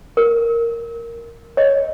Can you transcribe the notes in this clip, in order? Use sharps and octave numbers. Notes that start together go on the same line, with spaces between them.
A#4
C#5 D#5